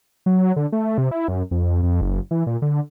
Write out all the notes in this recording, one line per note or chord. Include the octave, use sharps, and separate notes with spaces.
F#3
D3
A3
C3
E4
F#2
F2
F2
F#1
E3
A#2
D3